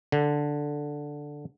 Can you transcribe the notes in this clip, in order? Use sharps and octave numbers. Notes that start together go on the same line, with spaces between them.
D3